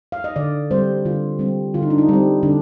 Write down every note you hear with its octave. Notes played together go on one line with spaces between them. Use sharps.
F5
D#5
D3 D5
G3 C4 C5
D3 F4
G3 C4
D3 F4
D#4
D4
D#4
G3 C4
D3 D4